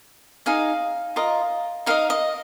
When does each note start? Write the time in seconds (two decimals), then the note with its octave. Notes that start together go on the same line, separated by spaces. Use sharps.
0.46 D#4 G#4 D#5 F5
1.16 F4 A#4 D#5
1.86 D#4 A#4 D#5 F5
2.10 D#5